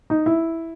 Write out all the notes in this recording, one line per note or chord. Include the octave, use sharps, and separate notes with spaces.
D#4
E4